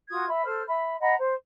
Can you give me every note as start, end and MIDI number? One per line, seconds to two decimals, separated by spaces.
0.09 0.27 65
0.09 0.27 66
0.09 0.27 87
0.09 0.27 92
0.28 0.43 76
0.28 0.43 83
0.45 0.62 69
0.45 0.62 72
0.45 0.62 89
0.67 0.96 76
0.67 0.96 83
1.00 1.15 75
1.00 1.15 78
1.00 1.15 82
1.00 1.15 83
1.18 1.34 72